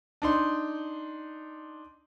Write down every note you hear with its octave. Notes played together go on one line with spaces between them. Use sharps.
D4 D#4 C6